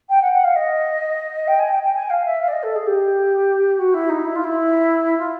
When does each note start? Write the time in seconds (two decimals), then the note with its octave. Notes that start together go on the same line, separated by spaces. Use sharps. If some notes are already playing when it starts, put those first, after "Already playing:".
0.09 G5
0.21 F#5
0.32 F#5
0.44 F5
0.56 D#5
1.47 G5
1.59 G#5
1.71 G5
1.83 G5
1.95 G#5
2.10 F5
2.25 E5
2.41 F5
2.48 D5
2.52 D#5
2.63 A4
2.76 G#4
2.86 G4
3.79 F#4
3.94 E4
4.09 D#4
4.25 E4
4.36 F4
4.44 E4
5.18 F4